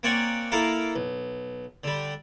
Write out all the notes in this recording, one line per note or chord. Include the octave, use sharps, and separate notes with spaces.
A#3 C4 C#5 D5 F#5 G#5
A#3 E4 A4 A#4 F5
B1
D3 G3